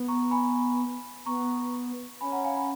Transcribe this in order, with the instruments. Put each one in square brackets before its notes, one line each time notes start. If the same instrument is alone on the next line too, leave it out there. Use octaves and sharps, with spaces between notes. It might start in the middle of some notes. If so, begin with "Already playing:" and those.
Already playing: [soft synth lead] B3
[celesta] A#5 C#6
G#5 B5
[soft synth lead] B3 [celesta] A#5 C#6
[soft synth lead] C#4 [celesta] G#5 B5
[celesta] F#5 A#5
F5 G#5
G#5 B5